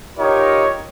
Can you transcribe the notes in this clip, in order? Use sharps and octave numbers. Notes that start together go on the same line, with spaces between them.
D#4 F4 G4 A#4 C#5